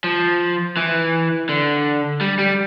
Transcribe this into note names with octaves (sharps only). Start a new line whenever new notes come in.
F3
E3
D3
G3
G3